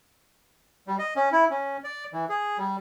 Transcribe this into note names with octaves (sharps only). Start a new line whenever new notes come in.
G3
D#5
C#4
E4
C#4
D5
E3
G#4
G3